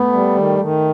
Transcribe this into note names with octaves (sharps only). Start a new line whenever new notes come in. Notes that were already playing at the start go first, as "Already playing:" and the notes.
Already playing: A3 B3
G3
D#3
D#3